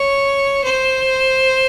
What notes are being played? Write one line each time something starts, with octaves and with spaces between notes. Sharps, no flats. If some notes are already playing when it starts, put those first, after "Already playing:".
Already playing: C#5
C5